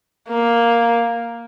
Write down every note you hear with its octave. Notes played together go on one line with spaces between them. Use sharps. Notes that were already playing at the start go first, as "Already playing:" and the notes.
A#3